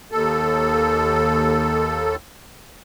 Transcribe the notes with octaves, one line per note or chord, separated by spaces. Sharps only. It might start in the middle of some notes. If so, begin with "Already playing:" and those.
D#2 A4